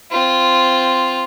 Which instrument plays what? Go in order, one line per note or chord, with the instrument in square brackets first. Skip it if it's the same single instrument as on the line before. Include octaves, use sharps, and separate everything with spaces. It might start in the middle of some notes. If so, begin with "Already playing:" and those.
[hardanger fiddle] C4 F4